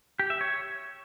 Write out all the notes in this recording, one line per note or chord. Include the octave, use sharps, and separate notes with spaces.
G4
E5
C#5